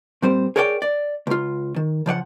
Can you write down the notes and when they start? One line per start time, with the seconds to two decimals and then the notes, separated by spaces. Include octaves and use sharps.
0.22 A#2 G3 C4 C5
0.56 G#4 A#4 C#5 D5 F#5 G5
0.82 D5
1.27 C#2 F4
1.76 D#3
2.06 C#3 F3 D5 F#5